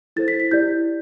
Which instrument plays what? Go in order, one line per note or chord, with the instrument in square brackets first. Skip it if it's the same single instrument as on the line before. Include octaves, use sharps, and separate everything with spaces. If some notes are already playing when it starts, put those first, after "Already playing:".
[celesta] E4 A4 C5 A6
B6
B6
E4 G4 D5 G6